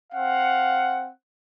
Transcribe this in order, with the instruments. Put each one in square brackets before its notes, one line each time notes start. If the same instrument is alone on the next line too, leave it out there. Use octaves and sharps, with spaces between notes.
[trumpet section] C4 F5 F#5